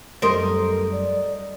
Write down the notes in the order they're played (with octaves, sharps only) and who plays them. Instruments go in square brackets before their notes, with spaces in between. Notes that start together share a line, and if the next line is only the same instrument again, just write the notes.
[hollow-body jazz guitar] F#2 G3 A3 [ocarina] A4 [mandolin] A#4 D#5 [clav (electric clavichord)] C5
[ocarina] D5